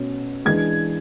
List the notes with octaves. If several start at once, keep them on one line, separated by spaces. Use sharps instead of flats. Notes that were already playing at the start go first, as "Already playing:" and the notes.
Already playing: B2 A3 C#4
E3 G#3 D4 G#6